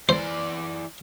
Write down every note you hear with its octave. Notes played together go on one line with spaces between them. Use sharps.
E3 C5 D5